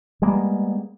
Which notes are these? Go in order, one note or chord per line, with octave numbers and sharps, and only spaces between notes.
G3 G#3 A#3 B3